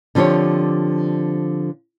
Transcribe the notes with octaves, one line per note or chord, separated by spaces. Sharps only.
D3 F3 C4 G4 C#5